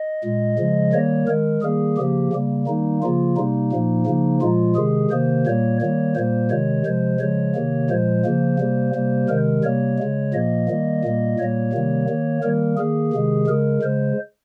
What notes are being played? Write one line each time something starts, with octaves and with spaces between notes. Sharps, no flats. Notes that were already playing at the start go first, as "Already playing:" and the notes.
Already playing: D#5
A#2 G#3
C#3 F3 G#3
D#3 G3 A#3 C#5
D#3 G#3 A#4
D#3 G3 A#3 G#4
C#3 F3 A#3 G4
C#3 G3 A#3
D#3 G3 A#3 D#4
C#3 F3 A#3 F4
C3 G3 A#3 D#4
A#2 F3 A#3
C#3 F3 A#3
A#2 F3 G#3 F4
C3 D#3 G#3 G#4
C3 D#3 A#3 C5
A#2 G3 A#3 C#5
D#3 G3 A#3 C#5
A#2 G3 A#3 C5
C3 D#3 G#3 C#5
C3 F3 G#3 C5
C#3 F3 G#3 C#5
C3 D#3 A#3
A#2 F3 G#3 C5
C#3 F3 A#3
C3 G3 A#3
C3 G3 A#3
C3 D#3 G#3 A#4
C3 G3 A#3 C#5
C#3 G#3
A#2 F3 A#3 D#5
D#3 G3 A#3
A#2 G3 A#3
A#2 G3 A#3 C#5
C3 D#3 G3 A#3
D#3 A#3
D#3 G3 A#3 A#4
D#3 A#3 G#4
C3 D#3 G#3
C#3 G#3 A#4
C#3 G#3 C5